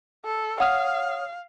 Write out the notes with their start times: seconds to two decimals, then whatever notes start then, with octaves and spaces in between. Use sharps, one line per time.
0.25 A4
0.60 C#5 F5 F#5 D#6 F6